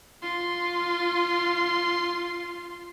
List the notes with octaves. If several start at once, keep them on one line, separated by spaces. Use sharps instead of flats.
F4 C6